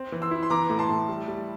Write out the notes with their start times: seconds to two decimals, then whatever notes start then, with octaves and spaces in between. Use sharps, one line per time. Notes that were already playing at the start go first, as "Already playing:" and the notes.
Already playing: C4
0.12 E3
0.22 C6 E6
0.31 E4
0.43 C6
0.50 E3 A#5 D6
0.69 A2
0.79 A5 C6
0.89 A2
1.08 G3
1.28 G3